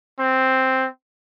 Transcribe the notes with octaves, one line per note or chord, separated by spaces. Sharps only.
C4